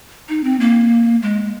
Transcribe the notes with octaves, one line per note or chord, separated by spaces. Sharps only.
D#4
C4
A#3
G#3